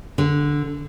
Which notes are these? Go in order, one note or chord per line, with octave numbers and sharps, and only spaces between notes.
D3